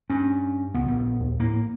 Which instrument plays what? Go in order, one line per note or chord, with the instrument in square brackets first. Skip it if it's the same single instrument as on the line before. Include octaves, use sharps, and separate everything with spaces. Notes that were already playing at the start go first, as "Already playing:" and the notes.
[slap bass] G2 [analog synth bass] C#4
[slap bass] C#2 [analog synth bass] B3
[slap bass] A#1
[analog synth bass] D#2
[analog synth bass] A2 [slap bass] A#3